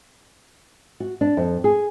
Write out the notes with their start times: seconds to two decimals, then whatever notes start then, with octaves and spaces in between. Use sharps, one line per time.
1.00 F#4
1.21 D4
1.37 F2
1.64 G#4